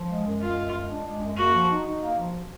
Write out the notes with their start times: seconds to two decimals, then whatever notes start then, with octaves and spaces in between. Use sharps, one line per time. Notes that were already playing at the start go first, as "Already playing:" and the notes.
Already playing: F3
0.09 G#3
0.25 F#2
0.41 G#3 F4
0.58 F#2
0.73 G#3
0.90 D4
1.06 G#3
1.22 F#2
1.37 A#3 F#4
1.54 F3
1.70 D#4
1.86 D#4
2.02 A#3
2.18 F3